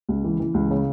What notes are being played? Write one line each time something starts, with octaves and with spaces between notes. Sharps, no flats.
C#2
E3
E3
C#2
C#3